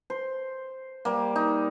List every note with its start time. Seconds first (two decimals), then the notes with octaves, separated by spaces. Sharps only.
0.10 C5
1.05 G3 A#3
1.36 D#4